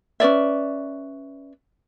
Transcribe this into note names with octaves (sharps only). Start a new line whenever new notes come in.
C#4 B4 D5 E5